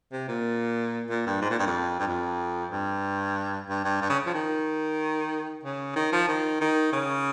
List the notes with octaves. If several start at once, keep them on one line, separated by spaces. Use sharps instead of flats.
C3
A#2
A#2
G2
G#2
A#2
G2
F2
G2
F2
G2
G2
G2
G2
C#3
F3
D#3
C#3
D#3
F3
D#3
D#3
C#3